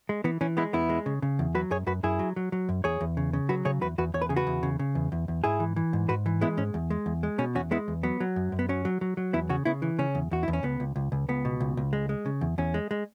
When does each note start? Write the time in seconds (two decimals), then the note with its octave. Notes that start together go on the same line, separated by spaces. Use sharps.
0.09 G#3
0.24 E3 B3
0.41 E3 C#4
0.57 G#3 B3 E4
0.73 E2 B3 E4
0.90 G#3
1.06 C#3
1.22 C#3
1.39 E2
1.55 F#3 F#4 B4
1.71 F#2 G#4 C#5
1.86 F#2 F#4 B4
2.03 F#2 E4 G#4
2.19 F#3
2.36 F#3
2.52 F#3
2.69 F#2
2.84 E2 G#4 C#5
3.01 E2
3.17 C#3
3.33 C#3
3.49 F#3 F#4 B4
3.65 C#3 G#4 C#5
3.81 E2 F#4 B4
3.98 E2 F#4 B4
4.14 E2 C#5
4.22 B4
4.29 C#3 G#4
4.36 F#4 B4
4.47 E2
4.63 C#3
4.79 C#3
4.95 E2
5.12 E2
5.28 E2
5.44 G#2 E4 G#4
5.60 E3
5.76 E3
5.93 G#2
6.09 G#2 F#4 B4
6.26 E3
6.41 G#3 B3 E4
6.57 G#2 C#4
6.74 E2
6.90 G#3
7.06 E2
7.23 G#3
7.38 B2 C#4
7.55 E2 C#4 F#4
7.71 G#3 B3 E4
7.88 E2
8.03 F#3 B3
8.20 F#3
8.36 F#2
8.52 F#2
8.59 B3
8.69 F#3 C#4
8.85 F#3
9.01 F#3
9.17 F#3
9.33 E2 B3 E4
9.49 C#3 C#4 F#4
9.65 C#3 B3 E4
9.82 E3
9.99 C#3 C#4
10.15 E2
10.31 E2 F#4
10.43 E2 E4
10.53 C#4
10.63 C#2 B3
10.80 C#2
10.96 C#2
11.12 C#2
11.29 C#2 B3
11.45 B2
11.60 C#2
11.77 C#2
11.93 G#3
12.09 G#3
12.26 C#3
12.41 E2
12.58 E2 C#4
12.74 G#3
12.91 G#3